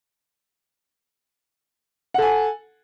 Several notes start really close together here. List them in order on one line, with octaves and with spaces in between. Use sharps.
F#5 A4 G#5